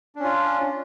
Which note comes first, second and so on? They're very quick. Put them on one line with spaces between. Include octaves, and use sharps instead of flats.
D4 C#4 F4